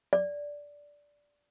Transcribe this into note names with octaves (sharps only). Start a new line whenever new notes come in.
D5